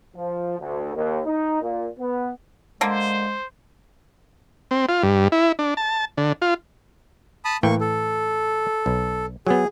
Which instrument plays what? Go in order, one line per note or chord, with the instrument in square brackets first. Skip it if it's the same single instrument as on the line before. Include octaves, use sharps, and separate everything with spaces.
[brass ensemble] F3
D2
D#2
D#4
A#2
B3
[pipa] D3 A#3 [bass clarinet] G#3 [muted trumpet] C5
[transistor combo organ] C4
F4
G2
E4
D4
A5
D3
F4
[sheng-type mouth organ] A5 B5 D#6
[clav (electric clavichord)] A2 E3 G5 [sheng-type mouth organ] A#3 C#6
[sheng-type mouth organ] A4
[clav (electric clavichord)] B1
[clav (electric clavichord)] F#3 B3 [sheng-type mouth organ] G#4